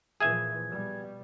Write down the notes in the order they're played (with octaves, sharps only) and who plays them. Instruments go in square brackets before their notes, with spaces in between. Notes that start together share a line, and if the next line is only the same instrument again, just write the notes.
[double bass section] A#2 E3 F3 [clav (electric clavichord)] G#4 E5 G#5 [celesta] G#6
[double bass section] B2 G3